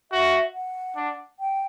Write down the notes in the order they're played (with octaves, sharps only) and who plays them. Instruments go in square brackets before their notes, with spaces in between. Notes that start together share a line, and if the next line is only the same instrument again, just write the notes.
[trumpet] F#4 [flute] E5
[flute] F#5
[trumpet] D4
[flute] G5